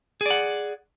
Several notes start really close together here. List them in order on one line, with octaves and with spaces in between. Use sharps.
G#4 D5 F#5